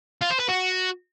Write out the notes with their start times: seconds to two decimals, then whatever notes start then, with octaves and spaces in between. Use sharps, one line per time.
0.22 F4
0.31 C5
0.40 B4
0.49 F#4